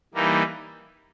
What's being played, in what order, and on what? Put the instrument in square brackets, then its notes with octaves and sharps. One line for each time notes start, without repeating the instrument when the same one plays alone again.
[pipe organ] E3 G3 A#3 D#4